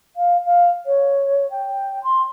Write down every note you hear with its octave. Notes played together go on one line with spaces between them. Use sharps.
F5
F5
C#5
G5
C6